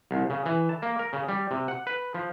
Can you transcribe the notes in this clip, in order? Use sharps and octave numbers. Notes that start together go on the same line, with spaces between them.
C2
C#3
E3
A5
A#3
A#4
C#3
G3
C3
F#5
B4
F3